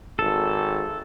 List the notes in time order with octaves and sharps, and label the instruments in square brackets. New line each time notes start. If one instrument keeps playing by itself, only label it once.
[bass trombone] G#1 [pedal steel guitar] A4